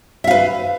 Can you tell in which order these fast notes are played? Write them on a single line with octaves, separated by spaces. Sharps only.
E5 F5 B4